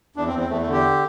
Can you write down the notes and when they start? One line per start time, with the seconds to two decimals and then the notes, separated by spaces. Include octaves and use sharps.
0.16 E2 D4
0.27 C4
0.33 E2
0.39 C4
0.50 E2 A3
0.61 A3
0.67 D3
0.73 G4